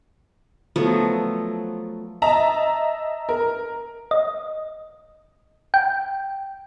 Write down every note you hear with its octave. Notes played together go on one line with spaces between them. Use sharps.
F3 F#3 A3 B3
D#5 E5 A5 A#5
A#4
D#5
G5